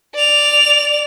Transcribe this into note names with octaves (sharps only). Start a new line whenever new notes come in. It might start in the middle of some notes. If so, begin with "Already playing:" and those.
D5 F7